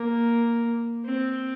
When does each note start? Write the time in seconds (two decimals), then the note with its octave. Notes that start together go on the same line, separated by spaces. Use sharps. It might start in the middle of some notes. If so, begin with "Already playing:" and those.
Already playing: A#3
1.05 C4